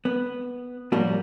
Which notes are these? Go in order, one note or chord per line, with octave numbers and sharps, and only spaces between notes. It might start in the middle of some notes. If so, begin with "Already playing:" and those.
B3
A2 F3 G3 A#3 F#4